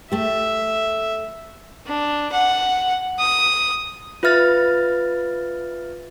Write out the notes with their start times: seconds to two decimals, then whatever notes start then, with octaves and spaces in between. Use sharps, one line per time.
0.12 A3 G4 E5
1.87 D4
2.32 F#5
3.19 D#6
4.23 F4 B4 E5 F6 A6